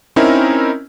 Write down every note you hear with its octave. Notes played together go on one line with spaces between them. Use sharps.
C4 C#4 D#4 E4 A#4